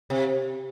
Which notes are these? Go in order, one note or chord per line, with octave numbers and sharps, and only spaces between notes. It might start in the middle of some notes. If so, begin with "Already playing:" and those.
C3